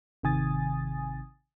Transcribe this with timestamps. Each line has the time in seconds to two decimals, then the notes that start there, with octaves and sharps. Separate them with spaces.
0.23 G#1 C3 D#3 G#5 D#6 A6